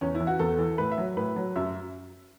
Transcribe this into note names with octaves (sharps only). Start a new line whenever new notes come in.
E2 C#4
E4
E3
F#4
E2 A4
E3
A2 B4
E5
F#3
A2 B4
F#3
F#2 E5